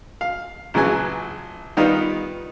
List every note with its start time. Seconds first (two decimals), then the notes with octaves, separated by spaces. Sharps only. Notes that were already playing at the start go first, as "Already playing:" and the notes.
0.21 F5
0.74 A#1 C#3 E3 F#3 G#5 F#6
1.77 D#3 G3 B3 D#4 F4